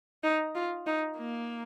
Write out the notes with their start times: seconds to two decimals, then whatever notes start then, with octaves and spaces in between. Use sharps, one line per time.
0.24 D#4
0.55 F4
0.87 D#4
1.18 A#3